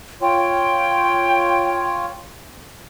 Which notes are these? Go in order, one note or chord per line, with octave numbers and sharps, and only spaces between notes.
F4 C#5 G5